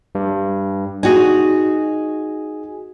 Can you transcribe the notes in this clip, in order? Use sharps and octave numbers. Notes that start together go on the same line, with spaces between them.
G2
D#4 F#4 G#4 G#5